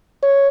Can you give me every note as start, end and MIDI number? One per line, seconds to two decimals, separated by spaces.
0.23 0.48 73